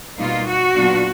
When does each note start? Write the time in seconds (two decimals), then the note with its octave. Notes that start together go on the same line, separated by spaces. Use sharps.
0.19 B2 G3 A#3 D#4 F4
0.47 F#4
0.76 A#2 F#3 B3 D4 F4